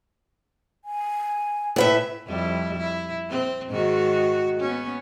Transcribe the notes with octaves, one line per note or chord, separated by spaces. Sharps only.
G#5
A2 B4 E5
F2 G3 E4
E4
C4
G#2 D#3 F#4
B3 C#4